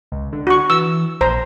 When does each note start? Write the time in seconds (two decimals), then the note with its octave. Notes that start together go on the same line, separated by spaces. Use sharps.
0.12 C#2
0.32 D3
0.47 F#4 C#6
0.70 E3 E6
1.21 A#1 C5 A#5